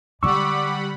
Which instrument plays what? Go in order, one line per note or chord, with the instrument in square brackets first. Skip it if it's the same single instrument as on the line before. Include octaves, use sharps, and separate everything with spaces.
[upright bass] D3 G#3 [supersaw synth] G3 F#5 B5 [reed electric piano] C#6 E6 [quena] D6